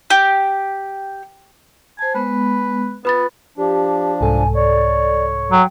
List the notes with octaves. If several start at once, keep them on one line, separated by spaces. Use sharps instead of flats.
G4
C5 G#5 A5
G#3 B3 B4
B3 F4 B4 B5 A6
F3 D4 G4
C2 G#2 A4 G#5
C#5 D5
F#3 G5